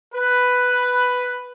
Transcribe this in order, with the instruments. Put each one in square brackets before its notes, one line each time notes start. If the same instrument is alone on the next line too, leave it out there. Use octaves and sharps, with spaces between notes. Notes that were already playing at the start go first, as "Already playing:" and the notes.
[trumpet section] B4